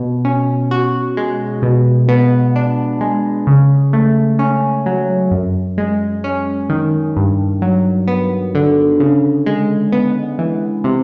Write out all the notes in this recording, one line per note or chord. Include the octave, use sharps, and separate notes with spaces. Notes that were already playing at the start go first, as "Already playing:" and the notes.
Already playing: B2
C#4
F#4
G#3
B2
B3
D4
G#3
C#3
A3
C#4
F#3
F#2
G#3
C#4
D#3
G2
F#3
B3
D3
C#3
G#3
B3
E3
C3